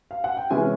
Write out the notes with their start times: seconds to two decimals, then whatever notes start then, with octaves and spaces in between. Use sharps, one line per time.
0.11 F5
0.24 F#5
0.37 G5
0.50 C3 E3 G#3 C#4 E4 G#5